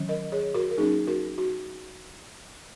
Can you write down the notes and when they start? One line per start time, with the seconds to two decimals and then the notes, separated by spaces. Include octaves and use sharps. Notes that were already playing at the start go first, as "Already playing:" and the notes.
Already playing: D#3 F#3 C#4
0.09 A#4 D#5
0.32 G#4 C#5
0.54 F#4 A#4
0.71 A#4
0.77 F#3 A#3 C#4 D#4 G#4
1.07 F#4 A#4
1.38 F#4